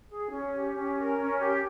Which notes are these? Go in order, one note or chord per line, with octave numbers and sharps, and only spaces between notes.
G#4
C#4
G4
C#4
A#4
C#4
G4